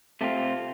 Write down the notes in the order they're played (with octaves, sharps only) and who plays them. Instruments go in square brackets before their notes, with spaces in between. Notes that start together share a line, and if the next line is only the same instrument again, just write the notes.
[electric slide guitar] C3 A3 C4 F4